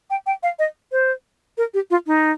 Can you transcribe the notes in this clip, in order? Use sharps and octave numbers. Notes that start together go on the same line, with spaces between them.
G5
G5
F5
D#5
C5
A#4
G4
F4
D#4